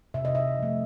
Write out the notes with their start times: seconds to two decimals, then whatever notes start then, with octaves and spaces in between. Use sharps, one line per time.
0.14 C3 E5
0.25 D#5
0.35 E5
0.58 F3 A3